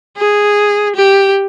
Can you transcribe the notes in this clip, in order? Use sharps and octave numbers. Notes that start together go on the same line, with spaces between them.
G#4
G4